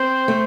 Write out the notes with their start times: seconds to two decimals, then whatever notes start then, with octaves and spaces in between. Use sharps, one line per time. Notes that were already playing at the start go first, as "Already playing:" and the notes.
Already playing: C4 C5
0.28 A3